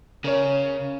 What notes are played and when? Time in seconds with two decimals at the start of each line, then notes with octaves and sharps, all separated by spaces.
0.24 C#3 A#4 C#5